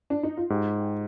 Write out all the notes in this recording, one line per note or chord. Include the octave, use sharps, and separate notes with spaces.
D4
D#4
F4
G#2 G4